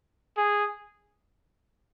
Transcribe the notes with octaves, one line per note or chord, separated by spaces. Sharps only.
G#4